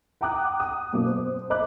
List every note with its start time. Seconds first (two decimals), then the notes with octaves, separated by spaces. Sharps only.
0.21 F#5 G5 A#5 D6 D#6 F#6
0.60 D#6
0.93 F#2 B2 A#3 D6
1.06 C5
1.50 C5 D#5 B5 D6 F#6